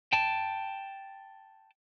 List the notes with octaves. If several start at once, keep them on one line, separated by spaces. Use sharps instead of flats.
G5 A5